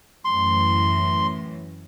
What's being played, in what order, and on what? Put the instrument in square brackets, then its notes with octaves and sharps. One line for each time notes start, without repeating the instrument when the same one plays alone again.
[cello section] F#2 A2 E3 [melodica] C6